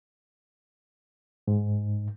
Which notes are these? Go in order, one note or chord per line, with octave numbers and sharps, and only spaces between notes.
G#2